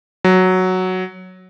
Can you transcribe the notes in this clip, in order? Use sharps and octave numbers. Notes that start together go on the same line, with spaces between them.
F#3